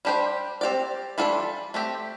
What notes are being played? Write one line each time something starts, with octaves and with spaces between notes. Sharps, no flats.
G3 D4 G4 C5
C4 G4 D5
E3 G3 D4 F4 A4
A3 C4 G4